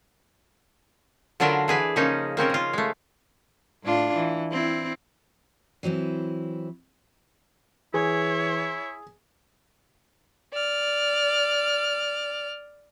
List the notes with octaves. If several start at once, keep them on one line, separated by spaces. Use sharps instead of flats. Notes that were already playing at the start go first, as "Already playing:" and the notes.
D3 F#3 D4 F4 A#4 B4
E3 G#4 B4 G#5
C#3 F3 A#3 C#4 D#4
A#3 C4 C#4 A#4
C#3 F4
G#3 A3
A2 D4 F4
E3
C4 E4
E3 F#3 C4 E4
E3 E4 G#4 C#5
D5 F6